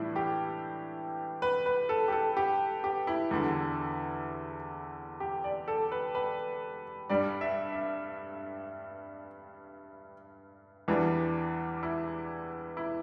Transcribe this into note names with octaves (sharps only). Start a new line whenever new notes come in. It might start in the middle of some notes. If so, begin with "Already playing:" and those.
Already playing: A2 E3 G3 D4 E4
G4
B4
B4
A4
G4
A4
G4
G4
E4
E2 D3 G3
G4
D5
A4
B4
B4
G2 G3 D5
E5
E5
E2 E3 G3 D4
E4
E4